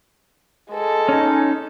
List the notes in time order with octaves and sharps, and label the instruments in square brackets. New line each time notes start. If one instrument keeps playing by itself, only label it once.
[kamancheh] G#3 A4
[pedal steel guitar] C#4 D#4